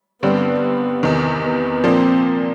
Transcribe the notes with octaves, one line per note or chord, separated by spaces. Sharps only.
G2 D3 G3 B3 C4
E2 C3 D#3
B3
A#2 F3 A#3 C4 D4